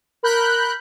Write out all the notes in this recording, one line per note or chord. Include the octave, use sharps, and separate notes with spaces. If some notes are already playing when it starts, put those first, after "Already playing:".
A#4 B5 F#6 G6